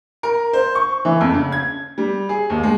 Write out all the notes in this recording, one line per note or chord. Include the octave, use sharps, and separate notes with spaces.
A#4
C5
C#6
E3
F2
C#3
G#6
G3
G#4
D#2
G#3